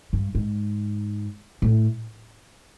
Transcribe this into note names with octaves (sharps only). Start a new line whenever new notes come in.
G2
G#2
A2